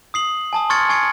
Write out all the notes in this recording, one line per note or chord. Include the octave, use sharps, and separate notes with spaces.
D#6 C7 F#7
G#5 A5 D#6
C6 C#6 F6 G#6 A6 C#7
G#5 C#6 G#6 C7 C#7